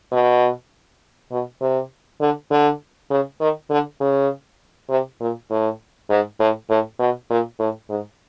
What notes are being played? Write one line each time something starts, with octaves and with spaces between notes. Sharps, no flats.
B2
B2
C3
D3
D3
C#3
D#3
D3
C#3
C3
A#2
A2
G#2
A2
A2
B2
A#2
A2
G#2